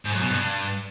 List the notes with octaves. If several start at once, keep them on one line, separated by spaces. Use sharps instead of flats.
G#2
F#2
B2
G2